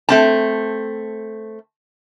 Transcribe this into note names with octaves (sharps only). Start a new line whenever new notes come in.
A3 C4 A5